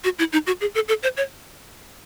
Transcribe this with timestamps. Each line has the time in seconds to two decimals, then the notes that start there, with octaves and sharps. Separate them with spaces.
0.04 F#4
0.19 E4
0.33 D#4
0.47 F#4
0.61 G#4
0.75 A4
0.88 A4
1.03 C5
1.17 C#5